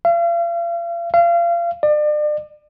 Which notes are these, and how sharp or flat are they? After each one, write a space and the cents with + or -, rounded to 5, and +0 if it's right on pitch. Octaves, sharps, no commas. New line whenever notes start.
F5 -40
F5 -30
D5 +35